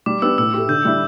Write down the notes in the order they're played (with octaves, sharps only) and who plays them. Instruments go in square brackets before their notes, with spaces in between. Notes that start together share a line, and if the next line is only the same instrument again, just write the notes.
[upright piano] G3 [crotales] D6
[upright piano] B3 D4 G4 [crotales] E6
[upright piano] A2 [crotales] E6
[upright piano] A3 G4
[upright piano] D3 [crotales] G6
[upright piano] G3 E4